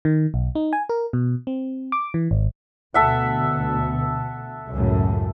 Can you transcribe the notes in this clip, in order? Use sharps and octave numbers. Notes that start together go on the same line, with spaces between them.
D#3
B1
D#4
G#5
A#4
B2
C4
D6
E3
G#1
D2 B2 A4 E5 F#5
C#2 F#2 A2